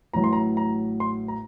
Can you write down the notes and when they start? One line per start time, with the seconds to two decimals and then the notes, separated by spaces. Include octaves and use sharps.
0.13 A1 A2 F#3 A#5
0.24 C6
0.33 A#5
0.57 A#5
1.00 C6
1.28 A#5